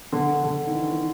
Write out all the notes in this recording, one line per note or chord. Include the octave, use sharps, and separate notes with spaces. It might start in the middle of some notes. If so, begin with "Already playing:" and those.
D3
D3
D#3
E3
E3